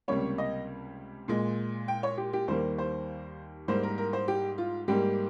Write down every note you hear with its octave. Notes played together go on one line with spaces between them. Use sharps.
C#2 C3 G3 A#3 C#5
D#5
A#2 G#3
G5
C#5
G4
G4
D#2 D#3 G3 A#3 C5
C5
G#2 G3 A#3 C5
A#4
A#4
C5
G4
F4
G#2 G3 A#3 G4